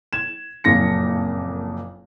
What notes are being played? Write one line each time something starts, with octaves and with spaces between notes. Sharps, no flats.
G#6 E7
F#1 F2 A#2 A#6 C#7